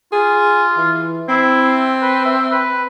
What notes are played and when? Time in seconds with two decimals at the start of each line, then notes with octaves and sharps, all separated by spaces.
0.12 F4 G#4
0.77 E3
1.29 C4 E4
2.02 B4
2.25 E5
2.52 B4